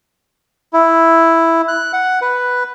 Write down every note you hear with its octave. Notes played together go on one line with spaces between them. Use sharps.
E4
F#6
F#5
B4